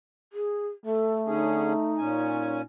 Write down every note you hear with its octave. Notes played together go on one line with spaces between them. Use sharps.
G#4
A3 A4
D3 C#4 D#4 G#4
A#2 C#4 G#5